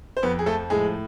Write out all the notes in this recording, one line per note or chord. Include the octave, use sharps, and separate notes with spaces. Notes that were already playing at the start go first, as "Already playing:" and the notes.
C5
F2 B3 B4
G#4
F3 A3 A4
A2 G#3 G#4